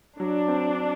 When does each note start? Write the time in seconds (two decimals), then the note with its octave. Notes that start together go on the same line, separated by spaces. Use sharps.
0.19 F#3 D4
0.48 C4